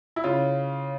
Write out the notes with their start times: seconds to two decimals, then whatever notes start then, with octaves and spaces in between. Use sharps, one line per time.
0.16 E4
0.24 C#3 F4